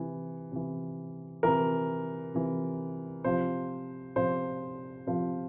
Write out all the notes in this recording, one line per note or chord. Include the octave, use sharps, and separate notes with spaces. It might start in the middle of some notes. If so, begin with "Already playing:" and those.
Already playing: C3 E3
C3 E3
C3 E3 A#4
C3 E3
C3 F3 C5
C3 F3 C5
C3 F3